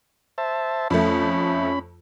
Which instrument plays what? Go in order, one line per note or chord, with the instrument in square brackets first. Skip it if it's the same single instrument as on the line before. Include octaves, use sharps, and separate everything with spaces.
[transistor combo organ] C5 E5 A5
[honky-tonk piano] F2 A3 [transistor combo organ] C#4 B5